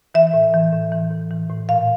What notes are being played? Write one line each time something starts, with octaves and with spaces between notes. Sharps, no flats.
E3 E5
A2
E3
A2
E3
A2
E3
A2
A#2 F5